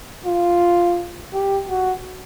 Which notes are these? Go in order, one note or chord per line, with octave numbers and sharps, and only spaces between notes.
F4
G4
F#4